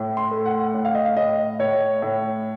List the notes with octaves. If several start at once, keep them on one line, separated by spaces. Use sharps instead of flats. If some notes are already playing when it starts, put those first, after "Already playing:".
Already playing: A2
C6
A3
F#5
A2 F#5
F5
D#5
F5
A2 D#5
A2 C#5
A2